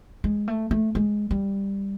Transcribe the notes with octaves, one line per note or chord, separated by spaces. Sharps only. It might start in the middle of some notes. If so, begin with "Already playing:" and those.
G#3
A3
A3
G#3
G3